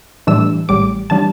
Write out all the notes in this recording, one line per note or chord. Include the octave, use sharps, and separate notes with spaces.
A2 E3 G3 D4 E6
A1 A2 G3 D6
E3 G3 D4 A5